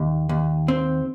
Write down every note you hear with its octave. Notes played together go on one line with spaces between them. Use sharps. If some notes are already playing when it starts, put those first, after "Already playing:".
Already playing: D#2
D#2
C4